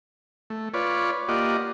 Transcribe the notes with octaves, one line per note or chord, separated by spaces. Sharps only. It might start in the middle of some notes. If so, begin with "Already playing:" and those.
A3
F4 B4 C#5 D5
A#3 F4 G4 D5 D#5 F#5